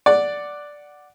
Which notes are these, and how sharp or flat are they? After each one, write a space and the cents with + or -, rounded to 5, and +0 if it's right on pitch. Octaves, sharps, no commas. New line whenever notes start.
D5 +0 F#5 +0